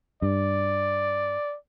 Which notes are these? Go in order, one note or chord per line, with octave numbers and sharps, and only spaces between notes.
G2 D5